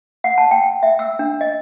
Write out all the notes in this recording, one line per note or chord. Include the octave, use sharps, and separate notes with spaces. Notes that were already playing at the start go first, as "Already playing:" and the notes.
F#5
A5
G5
E5
E6
D4
D#5